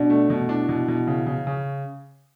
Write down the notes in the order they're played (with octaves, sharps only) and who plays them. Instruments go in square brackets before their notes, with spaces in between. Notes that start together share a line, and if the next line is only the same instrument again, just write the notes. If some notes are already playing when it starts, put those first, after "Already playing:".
Already playing: [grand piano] B2 [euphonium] D4
[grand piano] A3
B2
[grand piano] D4 [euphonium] E4
[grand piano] B2
B2
C#3
C#3
C#3